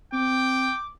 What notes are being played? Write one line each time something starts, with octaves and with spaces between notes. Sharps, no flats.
C4 G5 D6